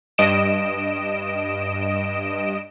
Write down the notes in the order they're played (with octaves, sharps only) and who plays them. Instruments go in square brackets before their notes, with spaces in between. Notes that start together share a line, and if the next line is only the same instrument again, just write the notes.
[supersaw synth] G2 D#5 D7 E7